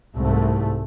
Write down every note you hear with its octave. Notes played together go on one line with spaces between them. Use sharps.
C2 G#2 A3